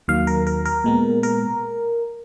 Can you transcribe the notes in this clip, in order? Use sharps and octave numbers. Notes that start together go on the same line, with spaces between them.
D#2 D#3 F#3 A#3 F5
A#4
A#4
A#4
A#2 G#3 B3
A#4